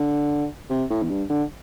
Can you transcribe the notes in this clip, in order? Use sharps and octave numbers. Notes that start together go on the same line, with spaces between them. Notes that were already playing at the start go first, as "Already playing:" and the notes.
Already playing: D3
C3
A2
E2
G2
D3